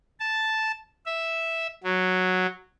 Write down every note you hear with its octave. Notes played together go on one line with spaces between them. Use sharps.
A5
E5
F#3